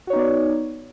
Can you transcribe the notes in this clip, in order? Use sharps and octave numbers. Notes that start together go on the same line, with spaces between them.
B3 D#4 F#4 C#5 D5